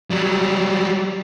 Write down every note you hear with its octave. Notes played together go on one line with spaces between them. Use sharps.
F#3 G3